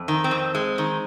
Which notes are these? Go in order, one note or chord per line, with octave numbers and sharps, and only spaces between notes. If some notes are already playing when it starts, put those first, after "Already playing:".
Already playing: F2
D#3
C4
F2
G#3
D#3